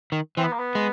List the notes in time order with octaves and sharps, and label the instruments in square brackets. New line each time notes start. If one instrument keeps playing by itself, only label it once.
[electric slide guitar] D#3
[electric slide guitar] E3 [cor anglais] C4
[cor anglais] B3
A#3
B3
[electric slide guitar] G#3